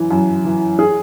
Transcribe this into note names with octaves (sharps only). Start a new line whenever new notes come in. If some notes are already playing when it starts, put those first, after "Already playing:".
Already playing: F#2 E3
F#2
E3
G#4